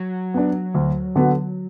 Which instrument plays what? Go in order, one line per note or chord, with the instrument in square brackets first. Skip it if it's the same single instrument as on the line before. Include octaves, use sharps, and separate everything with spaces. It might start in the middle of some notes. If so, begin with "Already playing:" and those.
Already playing: [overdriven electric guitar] F#3
[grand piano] B3 D4
D2
D3 B3 F#4